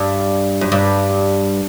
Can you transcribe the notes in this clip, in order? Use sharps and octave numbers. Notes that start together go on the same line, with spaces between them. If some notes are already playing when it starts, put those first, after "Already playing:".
Already playing: G2
F#2
G2